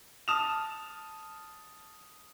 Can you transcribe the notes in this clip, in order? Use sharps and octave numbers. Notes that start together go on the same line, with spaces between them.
A5 D#6 F6 E7 F7